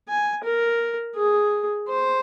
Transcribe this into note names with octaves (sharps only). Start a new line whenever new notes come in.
G#5
A#4
G#4
C5